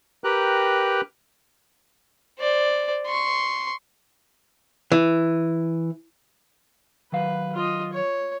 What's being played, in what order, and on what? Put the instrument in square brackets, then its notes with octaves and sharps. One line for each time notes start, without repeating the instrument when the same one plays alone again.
[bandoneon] G4 A#4 B4 G5 A#5 F#6
[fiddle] C5 D5
C6 C#6
[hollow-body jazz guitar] E3
[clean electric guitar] D#3 F#3 F5 [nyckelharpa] B4
[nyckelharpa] F4 D#5
C#5